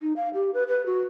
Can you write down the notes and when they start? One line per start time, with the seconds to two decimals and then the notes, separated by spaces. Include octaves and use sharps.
0.02 D#4
0.16 F5
0.34 G4
0.54 B4
0.68 B4
0.86 F#4